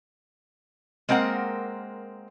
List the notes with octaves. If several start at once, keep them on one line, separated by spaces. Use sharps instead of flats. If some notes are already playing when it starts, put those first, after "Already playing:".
G#3 A#3 C4 A#4 F#5